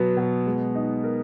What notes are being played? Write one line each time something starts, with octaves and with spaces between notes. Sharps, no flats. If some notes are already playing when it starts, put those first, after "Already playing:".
Already playing: B2 F#3 B3
B2
G#3
D#4
A#4